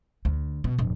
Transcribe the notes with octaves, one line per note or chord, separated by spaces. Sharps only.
D2
B2
D1 F2